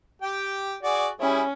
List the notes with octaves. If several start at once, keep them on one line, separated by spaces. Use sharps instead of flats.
G4 G5
F#4 G#4 D5
G3 C#4 E4 G#4